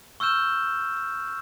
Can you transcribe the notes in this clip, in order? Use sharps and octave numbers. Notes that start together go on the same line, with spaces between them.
C#6 E6 F6 G6 E7